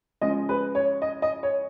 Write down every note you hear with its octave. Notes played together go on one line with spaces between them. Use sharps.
C#3 F3 G#3 D#5
B4
C#5
D#5
D#5
C#5